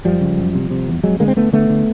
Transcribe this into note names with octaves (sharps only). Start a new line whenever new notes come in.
F#2 F3 G3
C#3
F#2
C3
C3
E2
F2 F#3 G#3
D3 G#3 A#3
C4
D3 A3 B3
D3 A3 B3
D3